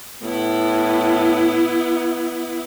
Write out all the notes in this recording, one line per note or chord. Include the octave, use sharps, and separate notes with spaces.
A2 B3 E4